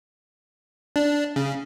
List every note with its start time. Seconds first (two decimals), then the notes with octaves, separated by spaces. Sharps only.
0.96 D4
1.36 C#3